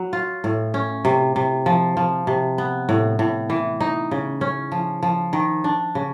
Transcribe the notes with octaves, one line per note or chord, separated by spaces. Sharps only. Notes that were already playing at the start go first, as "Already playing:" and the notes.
Already playing: F#3
F4
A2
C#4
C3
C3
F3
F3
C3
B3
A2
A2
E3
D#4
C#3
C#4
F3
F3
D#3
D4
C#3